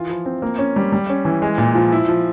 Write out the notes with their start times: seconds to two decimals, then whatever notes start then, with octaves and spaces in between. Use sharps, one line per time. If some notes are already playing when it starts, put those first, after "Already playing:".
Already playing: E3 F4
0.10 F3
0.26 C4
0.42 A#3
0.58 C#4
0.76 G3
0.92 G3
1.09 C#4
1.25 E3
1.42 G#3
1.58 A#2
1.75 F3
1.92 E4
2.08 F3